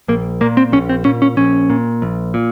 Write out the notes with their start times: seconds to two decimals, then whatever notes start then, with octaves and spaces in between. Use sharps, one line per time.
0.08 A#1 A#3
0.41 A#2 A#3
0.57 C4
0.72 A#1 C#4
0.89 C4
1.05 A#2 C#4
1.22 C#4
1.37 A#1 C#4
1.70 A#2
2.02 A#1
2.34 A#2